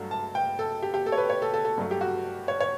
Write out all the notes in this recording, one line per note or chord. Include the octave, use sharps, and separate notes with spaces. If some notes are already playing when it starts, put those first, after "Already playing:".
Already playing: G2 F#3 A3
A5
G5
A4
G4
G4
A4
C#5
B4
C#5
A4
A4
A4
G2 F#3 A3
G4
F#4
C#5
C#5